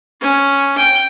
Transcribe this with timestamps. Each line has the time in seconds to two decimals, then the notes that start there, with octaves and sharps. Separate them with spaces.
0.21 C#4
0.77 G5